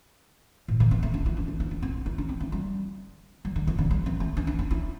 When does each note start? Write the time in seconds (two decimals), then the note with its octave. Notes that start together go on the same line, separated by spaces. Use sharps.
0.68 A2
0.80 D3
0.91 C4
1.03 A3
1.14 D4
1.26 E4
1.37 D4
1.48 D4
1.60 E4
1.71 D4
1.82 C4
2.06 E4
2.18 D4
2.29 C4
2.40 A3
2.52 G3
3.45 G3
3.56 D3
3.67 C3
3.78 D3
3.91 G3
4.06 C4
4.20 A3
4.37 D4
4.47 D4
4.59 D4
4.71 E4